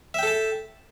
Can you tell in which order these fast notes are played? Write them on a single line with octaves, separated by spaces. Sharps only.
E5 G5 A4 A5